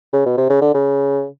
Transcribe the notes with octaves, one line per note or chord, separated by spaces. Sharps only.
C#3
B2
C3
C#3
D3
C#3